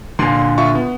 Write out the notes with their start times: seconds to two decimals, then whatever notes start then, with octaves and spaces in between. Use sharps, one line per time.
0.19 A#2 D3 C6
0.58 F4 E5 C#6
0.75 B3